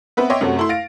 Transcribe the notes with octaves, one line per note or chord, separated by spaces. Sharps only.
B3 C4 B4 E5
C#5 D#5 E5 G5 C6 D6
F#2 C3 A3 C4 C#4 F#4
A3 E4 C6
F5 A6 A#6 D7